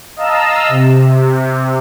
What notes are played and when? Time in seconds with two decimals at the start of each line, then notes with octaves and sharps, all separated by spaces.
0.16 D#5 F5 A5 A#5 E6
0.68 C3